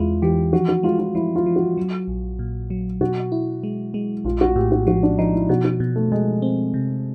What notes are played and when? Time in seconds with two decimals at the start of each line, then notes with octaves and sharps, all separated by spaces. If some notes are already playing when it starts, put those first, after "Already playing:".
Already playing: E2 G#3 E4 F4
0.22 E3 G4
0.53 F3 F#4
0.69 F#4
0.83 G#3 F4
0.99 F4
1.15 F3 E4
1.36 F4
1.46 F3
1.56 F#4
1.77 F#3
2.08 A#1
2.39 A#2
2.70 F#3
3.01 B2 F#4
3.32 E4
3.63 G#3
3.94 G#3
4.25 A#1 F4
4.41 F#4
4.56 A2 G4
4.72 F#4
4.87 F3 F#4
5.03 D4
5.18 F3 D#4
5.34 E4
5.49 B2 F#4
5.65 F#4
5.80 B2
5.96 A3
6.12 B2 G#3
6.42 C4
6.74 C3